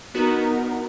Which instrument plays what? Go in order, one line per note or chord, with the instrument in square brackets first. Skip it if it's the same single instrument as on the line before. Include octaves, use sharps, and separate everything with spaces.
[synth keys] B3 F#4 [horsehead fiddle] D#4 A#4